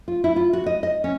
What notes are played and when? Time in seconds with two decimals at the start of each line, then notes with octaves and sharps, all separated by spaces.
0.08 F4
0.24 E4
0.36 F4
0.53 F#4
0.66 D#5
0.83 D#5
1.04 C#4